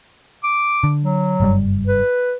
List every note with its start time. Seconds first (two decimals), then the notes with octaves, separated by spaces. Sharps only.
0.44 D6
0.84 D3
1.04 F#3
1.40 F#1 G2 G3
1.87 B4